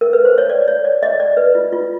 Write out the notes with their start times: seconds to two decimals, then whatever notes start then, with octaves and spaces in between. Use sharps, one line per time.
0.01 A#4
0.13 B4
0.25 C5
0.38 C#5
0.50 D5
0.68 C#5
0.85 D5
1.03 D#5
1.20 D5
1.37 B4
1.55 F4
1.72 F4